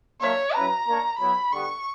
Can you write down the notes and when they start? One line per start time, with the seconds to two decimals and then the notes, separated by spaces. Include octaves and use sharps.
0.20 F#3 A#3 D4 A#4 C#5 E5
0.54 F#3 C#4 E4 B4 A#5
0.86 A#3 D4 A#4 C#5
1.18 F#3 B3 E4 B5
1.52 D3 G3 B3 C#6